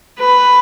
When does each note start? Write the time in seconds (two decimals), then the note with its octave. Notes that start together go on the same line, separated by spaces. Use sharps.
0.19 B4